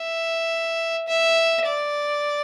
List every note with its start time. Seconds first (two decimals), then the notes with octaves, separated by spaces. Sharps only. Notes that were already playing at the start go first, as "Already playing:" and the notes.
Already playing: E5
1.08 E5
1.65 D5